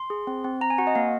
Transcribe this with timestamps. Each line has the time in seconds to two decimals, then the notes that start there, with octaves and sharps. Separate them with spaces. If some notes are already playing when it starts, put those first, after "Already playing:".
Already playing: C6
0.10 G#4
0.27 C4
0.44 C4
0.61 C4 A#5
0.70 G#5
0.78 F#4 F#5
0.87 D#5
0.95 A#3 F5